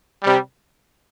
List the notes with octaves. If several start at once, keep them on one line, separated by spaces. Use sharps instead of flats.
C3 G3